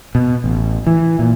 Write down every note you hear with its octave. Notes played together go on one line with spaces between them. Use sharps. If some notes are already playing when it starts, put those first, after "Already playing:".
B2
A1
E3
A#2